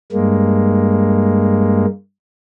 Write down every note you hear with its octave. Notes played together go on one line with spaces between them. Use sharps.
G2 G#3 A#3